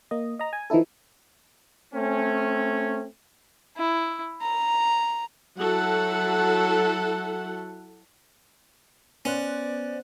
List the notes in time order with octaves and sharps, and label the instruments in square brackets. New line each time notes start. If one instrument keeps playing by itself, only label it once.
[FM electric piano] A#3 D#5
D#5 A#5
G#5
E3 F3 D#4 E4 A4
[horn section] A3 C4 C#4
[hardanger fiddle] E4
A#5
[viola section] F#3 E4 A4 F#5
[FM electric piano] B3 C5 F#6 [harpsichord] C#4 [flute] D5